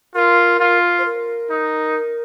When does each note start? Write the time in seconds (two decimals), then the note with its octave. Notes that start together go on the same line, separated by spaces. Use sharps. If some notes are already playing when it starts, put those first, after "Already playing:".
0.15 F4 A#4
0.60 F4
0.99 C5
1.06 A#4
1.50 D#4